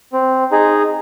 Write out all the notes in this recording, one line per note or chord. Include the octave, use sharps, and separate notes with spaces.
C4
D#4 G#4